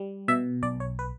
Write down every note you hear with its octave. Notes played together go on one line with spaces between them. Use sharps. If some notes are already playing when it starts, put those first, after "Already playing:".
Already playing: G3
B2 E5
B1 D5
C#5
B4